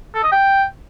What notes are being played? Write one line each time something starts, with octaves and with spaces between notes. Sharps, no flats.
A4
D#5
G5